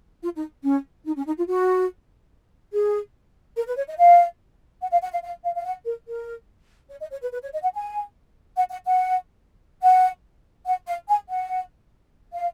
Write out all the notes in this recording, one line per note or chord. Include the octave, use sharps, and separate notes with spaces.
F4
D#4
C#4
D#4
C#4
D#4
F4
F#4
G#4
A#4
B4
C#5
D#5
F5
F#5
F5
F#5
F5
F5
F5
F5
F#5
A#4
A#4
C#5
D#5
C#5
B4
B4
C#5
D#5
F#5
G#5
F#5
F#5
F#5
F#5
F#5
F5
G#5
F#5
F5